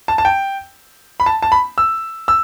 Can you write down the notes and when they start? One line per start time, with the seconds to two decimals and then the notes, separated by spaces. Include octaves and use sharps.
0.08 A5
0.18 A5
0.25 G5
1.20 B5
1.26 A5
1.42 A5
1.52 B5
1.78 E6
2.28 E6